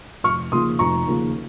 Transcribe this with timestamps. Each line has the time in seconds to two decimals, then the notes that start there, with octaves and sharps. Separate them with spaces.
0.24 F1 C#6 F6
0.52 D#2 C#3 F3 A#3 C6 D#6
0.79 F1 A#5 C#6
1.07 D#2 C#3 F3 A#3